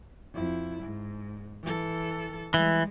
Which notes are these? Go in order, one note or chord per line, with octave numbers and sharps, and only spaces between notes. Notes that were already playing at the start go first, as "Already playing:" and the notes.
F2 E4
G#2
E3 A4
E3 G3 G#3